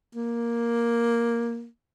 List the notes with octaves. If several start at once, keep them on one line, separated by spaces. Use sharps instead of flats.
A#3